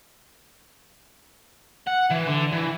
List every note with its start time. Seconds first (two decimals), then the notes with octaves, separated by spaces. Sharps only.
1.87 F#5
2.11 E3
2.28 D3
2.53 E3